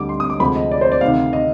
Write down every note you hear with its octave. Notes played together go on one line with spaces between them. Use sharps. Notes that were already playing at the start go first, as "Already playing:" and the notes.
Already playing: D2 D3 G3 D6
C6
D#6
D6
D2 C3 F3 G#3 B5
D#5
D5
C5
D5
D2 C3 D#3 F5
D#5